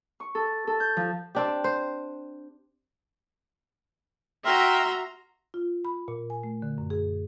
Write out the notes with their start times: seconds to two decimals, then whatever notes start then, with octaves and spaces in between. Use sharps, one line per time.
0.20 C#6
0.35 A4
0.67 A4
0.80 G6
0.97 F3
1.35 C4 D4 G4
1.64 C5
4.45 F#4 E5 G5 A#5 C6 F6
5.54 F4
5.85 B5
6.08 A#2
6.30 G#5
6.44 A3
6.62 D3
6.78 F#2
6.90 G#4